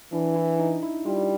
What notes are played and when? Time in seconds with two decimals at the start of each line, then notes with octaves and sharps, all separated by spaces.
0.13 E3 D4
0.36 E4
0.59 D#4
0.83 E4
1.06 G3 F4